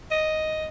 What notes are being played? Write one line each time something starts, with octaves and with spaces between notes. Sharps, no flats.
D#5